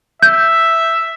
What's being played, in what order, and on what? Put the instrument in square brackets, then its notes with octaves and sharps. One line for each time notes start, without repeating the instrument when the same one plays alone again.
[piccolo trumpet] E5 [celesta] G6